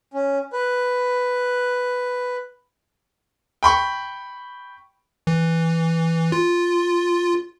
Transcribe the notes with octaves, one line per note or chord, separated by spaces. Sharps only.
C#4
B4
G5 B5 C#6
E3
F4